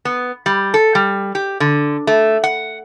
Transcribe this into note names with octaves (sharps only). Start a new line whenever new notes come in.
B3
G3
A4
G3
G4
D3
A3
F#5